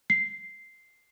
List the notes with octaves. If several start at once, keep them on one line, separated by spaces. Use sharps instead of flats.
C7